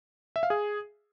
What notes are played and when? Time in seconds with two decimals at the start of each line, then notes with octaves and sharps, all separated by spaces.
0.36 E5
0.43 F5
0.50 G#4